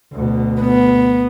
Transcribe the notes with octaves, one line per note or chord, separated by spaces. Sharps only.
D2 B2
B3